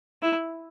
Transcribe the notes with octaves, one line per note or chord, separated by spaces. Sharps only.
E4